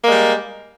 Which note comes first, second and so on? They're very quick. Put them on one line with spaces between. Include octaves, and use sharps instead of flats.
A#3 G#3 G3